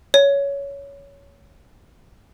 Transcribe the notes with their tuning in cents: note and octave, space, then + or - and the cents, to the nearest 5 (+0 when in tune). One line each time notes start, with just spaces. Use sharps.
C#5 +15